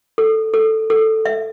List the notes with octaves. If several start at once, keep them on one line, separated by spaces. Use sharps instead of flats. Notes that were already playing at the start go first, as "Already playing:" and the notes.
A4
A4
A4
E5